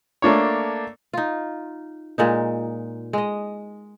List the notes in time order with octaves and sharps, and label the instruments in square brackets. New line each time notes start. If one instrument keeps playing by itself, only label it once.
[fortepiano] A3 A#3 D4 C#5
[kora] D#4 F4
A#2 G#3 D#4
G#3 D#5